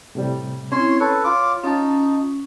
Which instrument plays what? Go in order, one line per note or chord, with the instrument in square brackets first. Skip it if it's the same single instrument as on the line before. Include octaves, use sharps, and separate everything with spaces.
[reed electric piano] A2 C3 G3
[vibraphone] C4 E4 [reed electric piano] C#4 [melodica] C#5 C6
[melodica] A4 B4 [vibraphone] C#5
[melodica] F4 D6
[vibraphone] C#4 [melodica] D#4 [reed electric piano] F4 A5